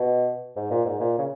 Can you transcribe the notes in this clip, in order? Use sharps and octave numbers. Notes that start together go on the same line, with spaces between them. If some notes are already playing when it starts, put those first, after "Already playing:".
Already playing: B2
G#2
A#2
G#2
A#2
C#3